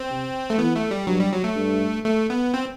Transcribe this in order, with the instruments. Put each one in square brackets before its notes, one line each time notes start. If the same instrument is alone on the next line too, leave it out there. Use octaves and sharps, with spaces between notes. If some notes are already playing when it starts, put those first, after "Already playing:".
Already playing: [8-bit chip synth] C4
[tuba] C3
[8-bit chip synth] A3
[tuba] E3 [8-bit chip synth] B3
[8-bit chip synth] A3
G3
[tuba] G2 [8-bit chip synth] F#3
[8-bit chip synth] G3
F#3
A3
[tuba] G2
[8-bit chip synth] A3
B3
C4